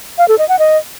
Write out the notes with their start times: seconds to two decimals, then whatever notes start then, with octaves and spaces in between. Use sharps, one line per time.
0.18 F5
0.28 A4
0.39 D#5
0.49 F#5
0.59 D#5